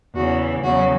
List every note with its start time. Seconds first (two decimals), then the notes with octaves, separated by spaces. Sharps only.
0.15 E2 C#3 E3 F#4
0.63 E2 C#3 F#3 F#4